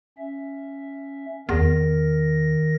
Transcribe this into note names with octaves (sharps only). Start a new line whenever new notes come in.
C#4 E5
E2 D#3 A#4 A#6